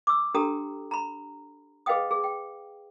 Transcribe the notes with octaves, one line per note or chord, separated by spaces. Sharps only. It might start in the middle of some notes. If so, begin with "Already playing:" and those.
D6 E6
D4 G4 A4 G5 A#5 D#6
A#5 B5
G#4 B4 D#5 F5 G5 D#6
G#4
G5